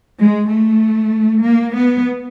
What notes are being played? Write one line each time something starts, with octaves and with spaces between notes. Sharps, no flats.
G#3
A3
A#3
B3